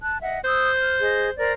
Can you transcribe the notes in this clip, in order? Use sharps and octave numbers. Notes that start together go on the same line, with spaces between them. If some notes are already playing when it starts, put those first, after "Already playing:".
A5 F#6
D#5 E5 F#5
C5 D#6 E6
F6
G#4 D#5
A#4 C5 D5